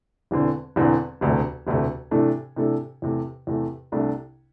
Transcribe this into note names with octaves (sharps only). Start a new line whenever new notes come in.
E1 E2 D3 C4
E1 E2 D3 C4
E1 D2 C3 A3
E1 D2 C3 A3
C3 E3 A3 D4 A4
C3 E3 A3 D4 A4
E2 C3 A3
E2 C3 A3
C2 C3 A3 D4